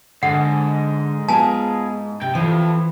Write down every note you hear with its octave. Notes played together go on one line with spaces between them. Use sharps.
G#2 D3 F#5
B3 F4 G#4 G#5 A5
C3 G5
F2 E3 F3